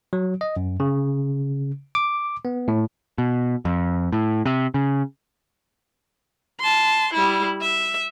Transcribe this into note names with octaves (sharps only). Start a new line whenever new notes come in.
F#3
D#5
F#2
C#3
D6
B3
A2
B2
F2
A2
C3
C#3
A5 C6
G3 E4
E5